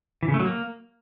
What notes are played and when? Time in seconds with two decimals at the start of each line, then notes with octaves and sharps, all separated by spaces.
0.23 E3
0.28 C#3
0.34 A3
0.40 F#3
0.45 A#3